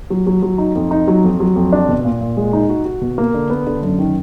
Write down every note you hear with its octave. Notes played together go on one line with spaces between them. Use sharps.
F#3
F#3
F#3
D#4
F2
D#4
F#3
F2
F#3
F2
D4
B2
A#2
A#2
G#3
D#4
F#4
F#4
B2
A#3
D3
B3
D3
F#2
D#3